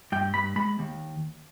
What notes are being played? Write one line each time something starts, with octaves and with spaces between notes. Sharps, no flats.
G2 G5
G2 B5
G#3 B5
D#2